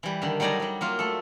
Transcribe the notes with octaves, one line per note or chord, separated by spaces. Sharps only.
E3 G3
D3 D#3
F#3 G3 D#4 D5 G#5 A#5
F#3 G3
F#3 A#3 F4
A3 A4